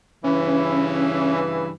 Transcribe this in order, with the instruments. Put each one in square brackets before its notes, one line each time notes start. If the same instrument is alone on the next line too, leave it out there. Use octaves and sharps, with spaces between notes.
[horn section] G2 C#3 E3 [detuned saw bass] C#4